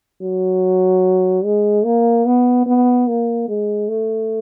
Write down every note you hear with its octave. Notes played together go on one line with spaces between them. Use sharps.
F#3
G#3
A#3
B3
B3
A#3
G#3
A3